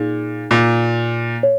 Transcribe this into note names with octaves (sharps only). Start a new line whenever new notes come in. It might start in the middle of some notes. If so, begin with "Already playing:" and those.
Already playing: A#2 D#4 G#4
A#2
C#5